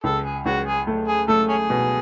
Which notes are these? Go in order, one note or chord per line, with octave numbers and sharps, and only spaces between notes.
C#2 A4
G#4
C#2 F#4
G#4
A3
G#4
A3 A4
C#4 G#4
B2